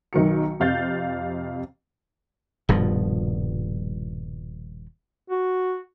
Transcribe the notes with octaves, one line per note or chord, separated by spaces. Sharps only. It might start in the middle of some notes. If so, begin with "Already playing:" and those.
B1 D#3 F#3 C#7
F2 C3 F5 G6 A6
D#1 G2 B2 F3
F#4